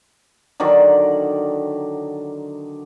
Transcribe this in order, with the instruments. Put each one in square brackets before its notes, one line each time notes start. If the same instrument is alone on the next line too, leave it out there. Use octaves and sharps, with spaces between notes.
[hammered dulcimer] D3 D#3 F#3 D5